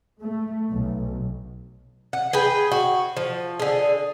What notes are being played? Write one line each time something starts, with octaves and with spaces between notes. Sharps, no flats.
A3
B1
F#5
G#4 B4 G5
F#4
F3
D3 G#4